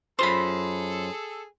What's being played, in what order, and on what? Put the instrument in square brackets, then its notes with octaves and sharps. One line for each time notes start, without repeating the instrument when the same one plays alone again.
[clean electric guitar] F#2 F4 C6 [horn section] G#4 A4 [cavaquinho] C5 B5